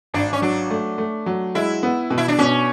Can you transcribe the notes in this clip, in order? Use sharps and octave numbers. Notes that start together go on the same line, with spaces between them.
G#1 D4
C#4
F#3 D4
A3
A3
F#3
G#3 E4
B3
B2
E4
D4
B2 C#4